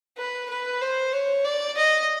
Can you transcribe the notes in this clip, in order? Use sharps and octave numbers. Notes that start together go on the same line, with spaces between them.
B4
B4
C5
C#5
D5
D#5